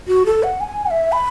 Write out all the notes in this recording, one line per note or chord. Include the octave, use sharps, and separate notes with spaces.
F#4
A4
F#5
G#5
F#5
E5
B5